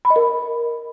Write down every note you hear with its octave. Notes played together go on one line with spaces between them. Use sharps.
B5
D#5
A#4